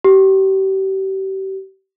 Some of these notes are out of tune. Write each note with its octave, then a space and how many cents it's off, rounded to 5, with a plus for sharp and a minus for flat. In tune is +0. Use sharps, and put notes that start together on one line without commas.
G4 -35